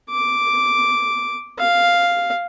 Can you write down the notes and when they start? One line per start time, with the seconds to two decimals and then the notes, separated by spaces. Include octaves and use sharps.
0.10 D6
1.59 F5